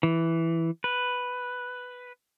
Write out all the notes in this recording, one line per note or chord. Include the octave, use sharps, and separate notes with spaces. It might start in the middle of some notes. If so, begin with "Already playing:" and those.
E3
B4